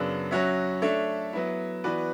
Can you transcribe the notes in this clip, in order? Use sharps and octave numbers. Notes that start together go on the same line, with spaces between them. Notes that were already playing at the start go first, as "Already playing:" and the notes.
Already playing: F#2 C#3 F#3 B3 D4
F#3 C#4 F#4 C#5 E5
A3 D4 A4 C#5 E5
F#3 B3 E4
E3 B3 F#4 B4 D5